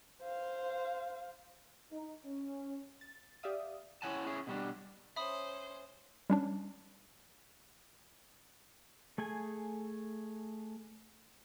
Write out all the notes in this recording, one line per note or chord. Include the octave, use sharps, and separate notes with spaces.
C5 F5
D#4
C#4
A6
G4 D5 E5 F5 D#6
C#4 E4 C#5 F#5 G#5 A5
C#4 E4 G#4
B2 G3 D4
C#4 C5 E5 B5 D#6
G3 C#4 D4
A3 G#4 G#5